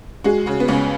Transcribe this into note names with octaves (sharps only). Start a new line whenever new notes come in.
G#3 F#4
C#3 F#4
B3
C#2 C#4